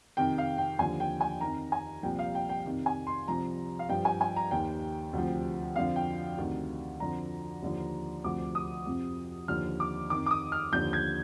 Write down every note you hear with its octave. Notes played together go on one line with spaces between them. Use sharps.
F2 C3 D#3 G5
F5
G5
D#2 D3 F3 G#5
G5
G#5
F2 D#3 A#5
G#5
C2 A#2 F3 G5
F5
G5
G5
F2 C3 D#3
G#5
C6
C2 C3 F3 A#5
F5
G2 F3 G5
G#5
G#5
A#5
D#2 D#3 G5
D2 C3 F3
F2 D3 F3 F5
G5
D2 C3 D#3
F2 D3 F3 A#5
D#2 D3 F3
D2 C3 F3 D6
D#6
F2 C3 F3
D#2 D3 F3 F6
D6
F2 D#3 D6
D6
D#6
F6
D#2 D3 F3 G6
G#6